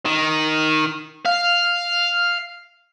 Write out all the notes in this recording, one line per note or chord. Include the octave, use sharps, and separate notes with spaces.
D#3
F5